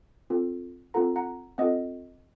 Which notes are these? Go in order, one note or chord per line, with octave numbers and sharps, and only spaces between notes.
C4 F4 A4
C4 F4 A4 F#5 A#5
F#5 A#5
C4 F4 A4 D#5 F#5